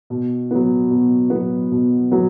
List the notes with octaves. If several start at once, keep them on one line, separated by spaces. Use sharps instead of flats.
B2
F#3 B3
B2
F#3 B3
B2
F#3 B3